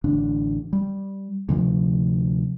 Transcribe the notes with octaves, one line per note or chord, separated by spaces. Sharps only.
A1 D3 D4
G3
D2 C3 F3